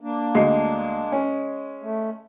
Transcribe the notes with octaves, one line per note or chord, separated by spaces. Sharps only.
A#3 D4
D2 G#3 C7
C#4
A3